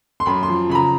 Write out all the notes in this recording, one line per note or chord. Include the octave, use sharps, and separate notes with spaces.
C6
F#2 B5
C6
F3
C#3 B5
A#5